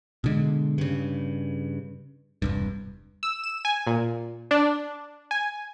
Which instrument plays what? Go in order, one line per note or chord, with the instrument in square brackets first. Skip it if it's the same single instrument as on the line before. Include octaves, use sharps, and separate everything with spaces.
[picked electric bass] B2 D3 G#3
G2 C#3
E1 C2 G2
[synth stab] E6
E7
G#5
A#2
D4
G#5